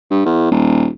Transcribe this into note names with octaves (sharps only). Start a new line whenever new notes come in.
G2
E2
D#1